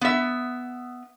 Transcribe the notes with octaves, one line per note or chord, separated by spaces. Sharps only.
B3 E5